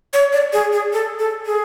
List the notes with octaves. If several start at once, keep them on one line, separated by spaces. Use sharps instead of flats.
C#5
D5
G#4
G#4
A4
A4
G#4